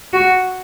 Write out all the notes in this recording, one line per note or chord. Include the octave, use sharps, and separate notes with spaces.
F#4